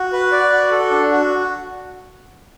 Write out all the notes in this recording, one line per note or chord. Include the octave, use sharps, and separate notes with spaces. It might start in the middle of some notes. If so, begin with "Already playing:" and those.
Already playing: F#4
B4
D5
F#4
A4
D4
F#4